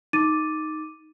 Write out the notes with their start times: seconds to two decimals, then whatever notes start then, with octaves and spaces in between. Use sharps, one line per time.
0.13 D#4 D6 A6 D#7